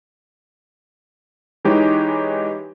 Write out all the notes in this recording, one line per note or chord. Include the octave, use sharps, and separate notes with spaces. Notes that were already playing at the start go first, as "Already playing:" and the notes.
E3 G#3 D#4 G4 C#5